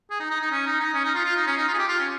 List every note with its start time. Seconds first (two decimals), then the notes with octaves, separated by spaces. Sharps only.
0.10 G#4
0.20 D#4
0.31 D#4
0.41 D#4
0.52 C#4
0.66 D#4
0.80 D#4
0.94 C#4
1.05 D#4
1.15 F4
1.25 F4
1.36 D#4
1.47 C#4
1.57 D#4
1.68 F4
1.74 G#4
1.78 G4
1.88 F4
2.00 C#4